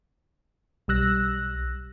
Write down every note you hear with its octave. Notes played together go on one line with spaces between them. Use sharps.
B1 G3 E6 F#6 A#6